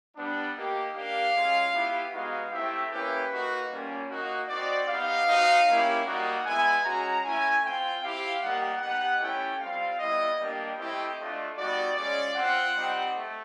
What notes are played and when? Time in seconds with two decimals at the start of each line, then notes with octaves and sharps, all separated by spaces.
0.16 G3 B3 D4
0.55 A#3 D#4 G4
0.94 A#3 D4 G4 F5
1.34 G#3 C#4 F4
1.74 B3 E4 G4
2.13 G#3 B3 D#4 F#4 F5
2.52 A3 C4 E4 G4 E5
2.91 A#3 C#4 E4 G4 B4
3.31 A#3 D#4 F#4
3.70 G3 A#3 C#4 F4
4.10 A#3 D#4 F#4
4.48 C4 D#4 F#4 D5
4.88 B3 D#4 G4 F5
5.27 C4 D#4 F#4
5.67 A#3 C#4 E4 G4
6.06 G3 A#3 D#4 F#4 F#5
6.46 G#3 B3 E4 G#5
6.84 G#3 C#4 F#4 A#5
7.24 A3 C#4 E4 G#5
7.63 C4 F4 G5
8.03 C4 E4 G4 F5
8.42 G3 A#3 D#4 G4 F#5
8.81 B3 D#4 G4 F#5
9.21 A3 C#4 E4 G4 G5
9.61 G3 C4 F4 F5
9.99 G3 B3 E4 D#5
10.39 G3 A#3 D4 G4 D#5
10.78 A3 C4 E4 G4
11.17 A3 D4 F4
11.57 G3 B3 D#4 F#4 D5
11.97 G#3 C#4 F4 D5
12.35 C4 F4 F#5
12.75 G3 C4 D#4 G4
13.14 A3